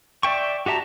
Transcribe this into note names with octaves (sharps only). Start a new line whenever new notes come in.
D5 E5 G5 C#6
F#4 G4 E5 A5 A#5